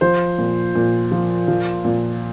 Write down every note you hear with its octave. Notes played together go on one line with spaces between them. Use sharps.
F3 C5
A#2
A#2
F3
F3
A#2